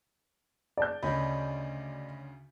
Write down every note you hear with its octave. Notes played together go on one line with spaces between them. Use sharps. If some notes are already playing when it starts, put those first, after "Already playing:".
D5 A5 G6
D2 C#3 C#5 D#5 B5